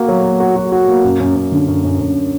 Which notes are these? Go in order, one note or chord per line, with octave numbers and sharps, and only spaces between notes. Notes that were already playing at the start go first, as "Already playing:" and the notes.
Already playing: A#3 F#4
F#3
A#3
F#4
F#4
F#4
A#3
F#2
F#2
F#2
D3
F#2
F#2
F#2